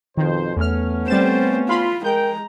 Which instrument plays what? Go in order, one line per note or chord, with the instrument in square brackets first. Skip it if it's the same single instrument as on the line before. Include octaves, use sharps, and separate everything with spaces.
[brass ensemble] F2 B2 C5 [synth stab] D#3
[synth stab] E2 F6 [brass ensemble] A3 B3 C#4
[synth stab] G3 A6 E7 [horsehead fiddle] C4 C5
[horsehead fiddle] F4 [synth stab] F5 B5 C6
[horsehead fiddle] G#3 A#5 [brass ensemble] A#4 G5 [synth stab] G6